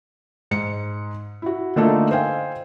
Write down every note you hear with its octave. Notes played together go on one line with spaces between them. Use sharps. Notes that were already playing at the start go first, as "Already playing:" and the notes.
G#2 C#7
E4 F#4
D3 A3 A#3 D#4 F4 A4
C5 D#5 F5 G5 G#5